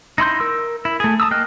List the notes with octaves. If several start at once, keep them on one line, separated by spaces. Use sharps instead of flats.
D#4 E4 C6 G6
A#4 E6
E4
A3 G#4
A5 A#5 D#6 E6
A#3 D#5 G5 F6 F#6